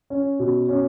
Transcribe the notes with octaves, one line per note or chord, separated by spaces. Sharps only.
C#4
B2
C#4